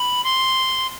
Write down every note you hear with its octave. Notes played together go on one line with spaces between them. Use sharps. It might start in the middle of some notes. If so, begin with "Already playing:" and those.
Already playing: B5
C6